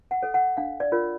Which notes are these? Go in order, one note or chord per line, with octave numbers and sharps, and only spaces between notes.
F#5
A4 C#5
F#5
D4 F5
D5
F4 A#4 C#5